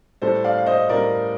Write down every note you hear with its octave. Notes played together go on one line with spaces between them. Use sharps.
A2 G3 A4 C5
D5 F5
F5
C5 D#5
A2 G3 A#4 D5